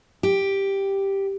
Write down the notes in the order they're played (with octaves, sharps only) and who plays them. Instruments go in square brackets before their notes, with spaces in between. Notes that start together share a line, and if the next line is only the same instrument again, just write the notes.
[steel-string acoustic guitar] G4